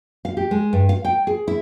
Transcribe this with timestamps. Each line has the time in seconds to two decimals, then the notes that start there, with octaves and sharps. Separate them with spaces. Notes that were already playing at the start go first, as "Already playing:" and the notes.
0.25 F5
0.37 G4
0.51 G#3
0.73 G2
0.89 F5
1.05 G5
1.27 G#4
1.48 E4